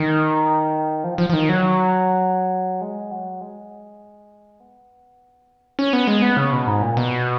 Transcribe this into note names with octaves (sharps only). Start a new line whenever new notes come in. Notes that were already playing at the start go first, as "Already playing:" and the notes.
Already playing: D#3
F3
F3
F3
D#3
F#3
G#3
F#3
G#3
B3
C#4
B3
G#3
B3
C#3
B2
G#2
A#2
B2